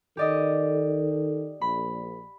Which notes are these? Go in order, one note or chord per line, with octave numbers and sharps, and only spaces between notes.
D#3 G4 A4 D5 D#5
A#1 B5